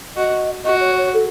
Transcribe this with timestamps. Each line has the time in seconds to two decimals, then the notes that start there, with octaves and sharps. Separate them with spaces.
0.17 F#4 D#5
0.64 F#4 D#5
0.81 C#5
0.98 C#5
1.14 A4